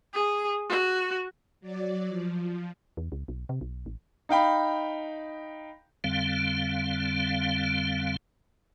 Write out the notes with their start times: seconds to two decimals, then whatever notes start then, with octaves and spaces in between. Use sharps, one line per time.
0.13 G#4
0.69 F#4
1.60 F#3 D5
2.08 F3
2.97 E2
3.12 C#2
3.28 B1
3.49 C3
3.61 B1
3.86 A1
4.29 D#4 F5 G5 B5
6.04 F2 D3 G3 C4 F5